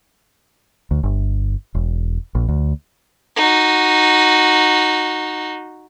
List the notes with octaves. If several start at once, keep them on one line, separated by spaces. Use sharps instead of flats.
D2
G1
E1
A#1
D2
D#4 F#4